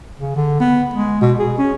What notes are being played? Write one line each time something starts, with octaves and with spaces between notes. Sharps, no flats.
C#3
D3
B3
G#3
B2
G#4
C#4